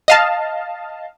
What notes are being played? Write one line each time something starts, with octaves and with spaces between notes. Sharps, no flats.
D#5 F5 A5